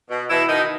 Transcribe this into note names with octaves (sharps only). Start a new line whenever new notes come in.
B2
B2 E3 E4
B2 D#3 D#4